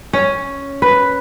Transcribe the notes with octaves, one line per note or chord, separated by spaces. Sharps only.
C#4
B4